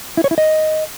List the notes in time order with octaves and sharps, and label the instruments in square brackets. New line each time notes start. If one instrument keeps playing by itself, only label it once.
[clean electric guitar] E4
C#5
E4
D#5